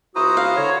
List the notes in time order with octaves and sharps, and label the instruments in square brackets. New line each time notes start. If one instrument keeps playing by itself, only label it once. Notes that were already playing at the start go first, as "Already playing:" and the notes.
[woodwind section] C#2 F#4 D#6 [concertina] E4 C5 A#5
[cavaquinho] F5
[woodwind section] D3 C#5